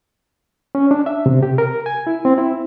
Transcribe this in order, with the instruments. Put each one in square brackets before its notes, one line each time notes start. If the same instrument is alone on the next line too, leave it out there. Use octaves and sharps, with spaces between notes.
[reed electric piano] C#4
D4
E5
C3
G4
A#4
G#5
E4
C4
E4